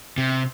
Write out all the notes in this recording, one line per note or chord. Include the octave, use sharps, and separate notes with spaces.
C3